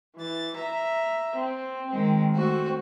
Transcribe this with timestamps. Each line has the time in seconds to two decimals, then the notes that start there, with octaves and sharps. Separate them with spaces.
0.17 E3 A6
0.57 E5 A#5
1.36 C4
1.91 D#3 G#3 C4
2.33 A3 C4 F#4